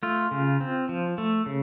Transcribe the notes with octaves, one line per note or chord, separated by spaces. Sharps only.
A3 F4
C#3
C4
F3
A3
C#3